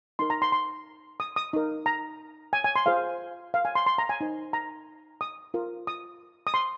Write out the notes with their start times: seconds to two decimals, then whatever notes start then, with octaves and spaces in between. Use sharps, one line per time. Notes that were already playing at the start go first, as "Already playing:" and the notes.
0.19 D#4 A#4 C6
0.30 A#5
0.42 C6
0.52 C6
1.20 D#6
1.36 D#6
1.53 D#4 A#4
1.86 A#5
2.53 G#5
2.64 G#5
2.76 C6
2.86 F4 G#4 C5 F5
3.54 F5
3.65 G#5
3.75 C6
3.86 C6
3.98 A#5
4.09 G#5
4.21 D#4 C5
4.53 A#5
5.21 D#6
5.54 F4 A#4
5.87 D#6
6.47 D#6
6.54 C6